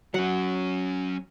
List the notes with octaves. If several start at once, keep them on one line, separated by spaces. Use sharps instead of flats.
F#3 C#4 F#5